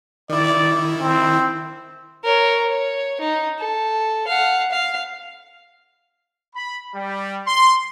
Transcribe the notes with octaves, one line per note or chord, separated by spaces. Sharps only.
D#3 E4 D5
C4
A#4 C#5
C#5
D#4
A4
F5 F#5
F5
B5
G3
C6